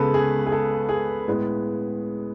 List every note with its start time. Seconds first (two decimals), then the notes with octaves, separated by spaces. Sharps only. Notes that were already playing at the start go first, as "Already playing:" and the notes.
Already playing: C#2 C#3 G#3 B3 A4 B4
0.14 G#4
0.46 G#4
0.52 A4
0.89 G#4
1.28 A2 G#3 B3